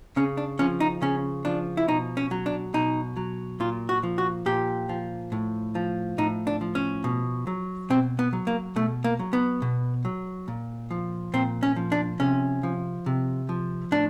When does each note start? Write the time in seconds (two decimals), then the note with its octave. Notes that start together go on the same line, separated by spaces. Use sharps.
0.16 C#3 C#4
0.37 D4
0.59 F3 C#4
0.80 D#4
1.02 C#3 C#4
1.45 F3 D4
1.77 E4
1.88 B2 D#4
2.17 C#4
2.31 F#3
2.46 D4
2.74 B2 D#4
3.17 F#3
3.60 A#2 F4
3.89 F#4
4.03 F3
4.18 F#4
4.46 A#2 G4
4.89 F3
5.32 A2
5.75 F3
6.18 A2 D#4
6.47 D4
6.61 F3
6.75 C#4
7.04 B2
7.47 F#3
7.90 B2 C4
8.19 B3
8.33 F#3
8.47 A#3
8.76 B2 A3
9.04 A#3
9.19 F#3
9.33 B3
9.62 B2
10.05 F#3
10.48 A#2
10.91 F3
11.34 A#2 C4
11.63 C#4
11.76 F3
11.92 D4
12.20 C3 C#4
12.63 F3
13.06 C3
13.49 F3
13.91 A2 D4